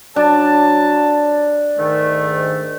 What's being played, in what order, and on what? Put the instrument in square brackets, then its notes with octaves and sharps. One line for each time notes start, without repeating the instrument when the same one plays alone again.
[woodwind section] F#3 A5 [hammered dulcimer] D4
[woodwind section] G#2 D#3 A3